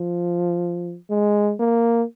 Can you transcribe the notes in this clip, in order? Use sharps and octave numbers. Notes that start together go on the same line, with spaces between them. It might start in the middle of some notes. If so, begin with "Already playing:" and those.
Already playing: F3
G#3
A#3